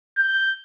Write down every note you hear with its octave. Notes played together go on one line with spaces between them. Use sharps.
G6